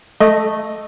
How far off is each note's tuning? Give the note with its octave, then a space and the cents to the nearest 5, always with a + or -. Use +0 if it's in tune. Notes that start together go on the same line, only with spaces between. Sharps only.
A3 +0 D#5 +0